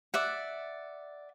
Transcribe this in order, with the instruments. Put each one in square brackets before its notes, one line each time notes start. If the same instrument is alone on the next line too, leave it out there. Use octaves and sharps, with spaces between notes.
[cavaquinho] D5 E5 F#5